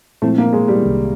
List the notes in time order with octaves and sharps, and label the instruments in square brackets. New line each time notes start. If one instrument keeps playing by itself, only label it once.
[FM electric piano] A#2 F3 G#3 C4 E4 [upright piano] A3
[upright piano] A#3
G#3
G3
[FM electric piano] C2 C3 D#3